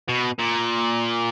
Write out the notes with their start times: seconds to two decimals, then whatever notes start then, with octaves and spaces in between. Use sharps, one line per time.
0.09 B2
0.39 A#2